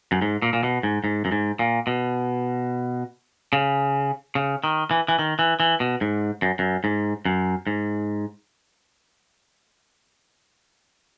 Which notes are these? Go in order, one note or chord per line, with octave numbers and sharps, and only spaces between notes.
F#2
G#2
A#2
A#2
B2
G#2
G#2
F#2
G#2
A#2
B2
C#3
C#3
D#3
E3
E3
D#3
E3
E3
B2
G#2
F#2
F#2
G#2
F#2
G#2